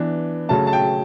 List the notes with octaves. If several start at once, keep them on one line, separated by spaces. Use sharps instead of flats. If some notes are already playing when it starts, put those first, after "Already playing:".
Already playing: E3 B3 D4
C#3 F#3 A3 C#4 A5
A5
G5